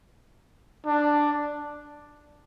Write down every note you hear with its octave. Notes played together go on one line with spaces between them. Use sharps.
D4